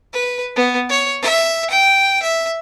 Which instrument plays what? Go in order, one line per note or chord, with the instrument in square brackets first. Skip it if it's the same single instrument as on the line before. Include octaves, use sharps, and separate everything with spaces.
[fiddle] B4
B3
C#5
E5
G5
E5